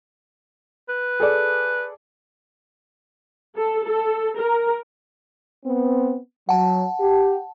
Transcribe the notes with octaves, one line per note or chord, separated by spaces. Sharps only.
B4
G#4 A4 D5
A4
A4
A#4
B3 C4
F#3 F#5 A5
G4